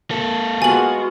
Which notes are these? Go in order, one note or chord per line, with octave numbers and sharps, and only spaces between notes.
A#3 A4
G#3 B3 F4 F#4 G#5 F#7